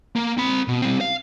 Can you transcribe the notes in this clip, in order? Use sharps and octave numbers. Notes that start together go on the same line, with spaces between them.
A#3
C4 B5
B2
G3 C4
F5